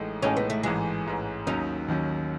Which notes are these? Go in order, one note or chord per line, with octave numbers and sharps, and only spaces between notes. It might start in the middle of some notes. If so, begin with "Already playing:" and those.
Already playing: A1 A2 G#3 D#4 A4
A1 A2 G#3 C#4 D#4 A4
B3
A3
A1 G#2 E3 G#3
A1 G#2 E3
D#2 D#3 F#3 C#4 D#4
D#2 D#3 F#3 C#4